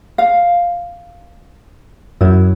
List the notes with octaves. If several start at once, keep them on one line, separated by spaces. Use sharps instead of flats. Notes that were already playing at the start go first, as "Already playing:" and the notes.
F5
F#2 E4